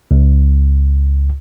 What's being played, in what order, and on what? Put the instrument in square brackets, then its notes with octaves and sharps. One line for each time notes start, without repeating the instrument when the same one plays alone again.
[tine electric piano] C#2